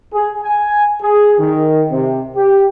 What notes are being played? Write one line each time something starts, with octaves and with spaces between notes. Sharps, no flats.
G#4
G#5
G#4
D#3
C3
G4